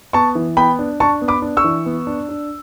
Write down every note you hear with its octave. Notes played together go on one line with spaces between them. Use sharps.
B3 A5 C#6
E3
B3 G5 B5
D4
D4 A5 C#6
B3
B5 D6
D4
C#6 E6
E3
B3
D4
D4